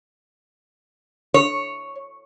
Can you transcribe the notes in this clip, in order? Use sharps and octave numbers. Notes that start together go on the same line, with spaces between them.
C#5